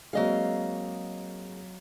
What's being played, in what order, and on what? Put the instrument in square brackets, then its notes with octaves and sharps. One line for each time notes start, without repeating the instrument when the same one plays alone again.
[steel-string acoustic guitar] F#3 D#5 F5 [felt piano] G#3 A#3 C4